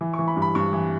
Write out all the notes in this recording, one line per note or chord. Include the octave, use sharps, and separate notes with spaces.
E3
C#6
E3
B5
G2
B5
G2 C#6
E3